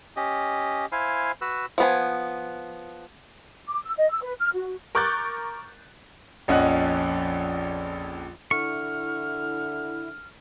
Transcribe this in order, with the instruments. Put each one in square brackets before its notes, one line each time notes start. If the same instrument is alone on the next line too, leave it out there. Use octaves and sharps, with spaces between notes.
[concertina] C#4 G4 D#5
E4 C5 F5 G#5
F#4 B4 E6
[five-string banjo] F3 B3 G#5
[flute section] D6
E6
D#5
E6
B4
F6
F#4
[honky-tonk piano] A#4 C#6 D6 F#6 G6 A6
[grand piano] A#1 F2 C#4 D#5 F#5 F#6
[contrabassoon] D3 [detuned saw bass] E4 [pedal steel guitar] C#6 [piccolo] F6